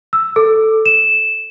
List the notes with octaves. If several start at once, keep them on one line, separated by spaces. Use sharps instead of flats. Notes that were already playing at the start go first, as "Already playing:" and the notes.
E6
A4
E7